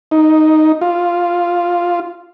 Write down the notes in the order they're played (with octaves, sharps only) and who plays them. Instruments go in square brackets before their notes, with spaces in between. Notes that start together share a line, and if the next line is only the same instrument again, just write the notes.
[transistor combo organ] D#4
F4